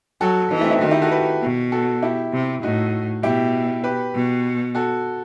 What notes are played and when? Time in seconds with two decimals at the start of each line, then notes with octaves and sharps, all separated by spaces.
0.21 F#3 F#4 A4
0.51 E3 B3 D#4
0.61 A3 C4
0.67 D#4
0.71 C4 E4
0.81 D#3 D#4 F#4
0.91 E4 G4
1.02 F#4 A4
1.11 G4 B4
1.42 B2
1.72 F#4 A4
2.02 E4 G4
2.33 C3
2.63 A2 D#4 F#4
3.23 B2 E4 G4
3.84 G4 B4
4.15 B2
4.75 F#4 A4